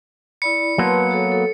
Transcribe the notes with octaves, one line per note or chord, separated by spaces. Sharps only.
E4 D5 B5 C#7
F#3 A#3 B3 B4 A5 C6
F#4 A4 C#5
A4